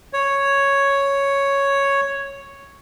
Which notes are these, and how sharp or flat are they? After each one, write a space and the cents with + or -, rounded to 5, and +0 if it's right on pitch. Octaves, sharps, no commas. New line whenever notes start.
C#5 +0